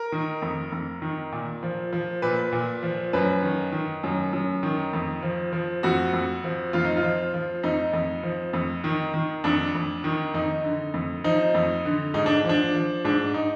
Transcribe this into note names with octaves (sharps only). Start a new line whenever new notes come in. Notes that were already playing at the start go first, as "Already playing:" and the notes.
Already playing: A#4
D#3
F2
F2
D#3
A#2
F3
F3
A#2 B4
A#2
F3
F#2 B4
D#3
D#3
F#2
F#2
D#3
F2
F3
F3
F2 F#4
F2
F3
F2 F4
D#4
F4
F3
F3
F2 D#4
F2
F3
F2
D#3
D#3
F2 D4
F2
D#3
F2 D#4
D3
F2
F3 D#4
F2
D3
G#2 D#4
D4
F3 D4
F3
G#2 D4
D#4